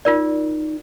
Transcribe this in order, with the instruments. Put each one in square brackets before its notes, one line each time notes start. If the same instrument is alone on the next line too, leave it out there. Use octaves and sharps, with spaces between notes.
[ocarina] D#4 [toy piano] F4 A#4 D5